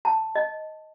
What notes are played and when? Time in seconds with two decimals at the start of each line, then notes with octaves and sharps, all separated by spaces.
0.05 A5
0.35 D#5